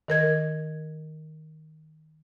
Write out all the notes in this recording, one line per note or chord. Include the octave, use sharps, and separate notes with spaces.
D#3 A#4 G#6